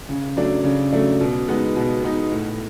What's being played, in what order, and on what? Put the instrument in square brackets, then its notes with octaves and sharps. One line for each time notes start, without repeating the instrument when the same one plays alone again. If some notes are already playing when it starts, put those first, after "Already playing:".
[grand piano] C#3
F#3 A3 D4
C#3
F#3 A3 D4
B2
G#3 B3 D#4
B2
G#3 B3 D#4
A2